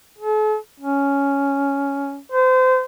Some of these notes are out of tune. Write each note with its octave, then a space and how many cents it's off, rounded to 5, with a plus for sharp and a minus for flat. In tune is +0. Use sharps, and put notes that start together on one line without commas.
A4 -45
C#4 +10
C5 -30